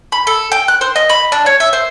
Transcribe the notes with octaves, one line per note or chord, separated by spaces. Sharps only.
B5
A4
G5
F#6
C5
D#5
B5
D4
C#5
E5
C5